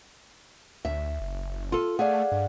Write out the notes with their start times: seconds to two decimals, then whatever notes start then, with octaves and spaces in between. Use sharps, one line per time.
0.85 D2 E5
1.20 F#1
1.72 F4 A4
1.99 A3 G#4 D5 F5 F#5
2.32 G2